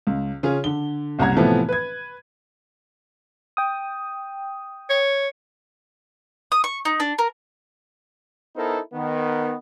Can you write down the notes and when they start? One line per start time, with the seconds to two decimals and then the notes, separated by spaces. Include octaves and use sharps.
0.07 C#2
0.43 C#3 C#4 F4 G#4
0.64 D3 G7
1.19 F#1 C2 F#5 A#5 G#6
1.36 A2 C3 E3 F3 A3 B3
1.69 B4 G#6
3.57 G5 D#6
4.89 C#5
6.52 D#6
6.64 C#6
6.85 D#4
7.00 D4
7.18 A#4
8.56 B3 D#4 E4 A4 A#4 C5
8.93 D#3 B3